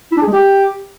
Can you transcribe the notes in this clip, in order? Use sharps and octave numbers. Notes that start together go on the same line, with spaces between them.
E4
D4
G#4
G#3
G4